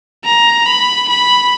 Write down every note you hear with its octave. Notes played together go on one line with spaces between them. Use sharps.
A#5
B5
B5